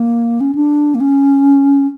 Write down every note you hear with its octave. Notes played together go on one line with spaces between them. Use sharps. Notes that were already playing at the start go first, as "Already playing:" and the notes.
Already playing: A#3
C#4
D4
A#3
C#4